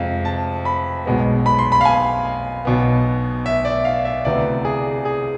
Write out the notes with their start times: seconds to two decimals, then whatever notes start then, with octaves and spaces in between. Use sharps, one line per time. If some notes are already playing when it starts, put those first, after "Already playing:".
Already playing: F2 C3 G#3 C4 F5
0.25 A5
0.65 B5
1.05 B1 B2 G#3 B3
1.46 B5
1.59 C6
1.72 B5
1.81 F5
1.85 G#5
2.65 B1 B2 B3
3.46 E5
3.65 D5
3.85 F5
4.05 E5
4.25 D2 C3 E3 B3 D5
4.65 G#4
5.05 G#4